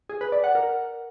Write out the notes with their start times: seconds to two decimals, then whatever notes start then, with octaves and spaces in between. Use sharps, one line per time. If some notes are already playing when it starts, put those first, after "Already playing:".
0.09 G#4
0.21 B4
0.32 D5
0.44 F#5
0.55 A#4